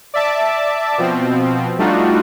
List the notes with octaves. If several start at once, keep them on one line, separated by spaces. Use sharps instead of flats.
D5 E5 A5 D6
B2 F3 C4
G3 A3 D4 D#4 F4 F#4